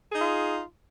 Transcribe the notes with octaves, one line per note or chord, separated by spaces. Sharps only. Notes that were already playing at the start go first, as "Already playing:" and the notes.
D#4 F4 G#4